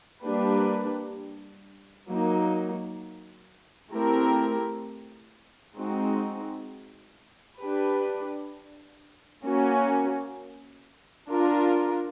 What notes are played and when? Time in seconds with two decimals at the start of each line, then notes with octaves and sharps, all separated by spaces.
0.23 G3 A#3 D4 G4 B4
2.08 F#3 A#3 D#4
3.92 A3 C4 E4 G4 A#4
5.75 G#3 C4 D#4 F#4
7.60 D4 G4 B4
9.44 A#3 C#4 F#4
11.28 D4 F4 A#4